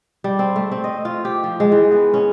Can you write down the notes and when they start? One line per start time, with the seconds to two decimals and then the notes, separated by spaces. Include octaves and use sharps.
0.24 G3
0.39 C4
0.56 A3
0.72 C4
0.84 D#5
1.05 F4
1.25 G4
1.44 F3
1.60 G#3
1.72 E3
1.91 B3
2.14 C#4